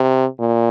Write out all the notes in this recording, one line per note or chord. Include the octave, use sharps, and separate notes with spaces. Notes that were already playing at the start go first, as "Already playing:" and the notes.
Already playing: C3
A#2